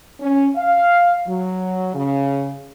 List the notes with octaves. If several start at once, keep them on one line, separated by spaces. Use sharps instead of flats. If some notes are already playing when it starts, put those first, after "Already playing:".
C#4
F5
F#3
C#3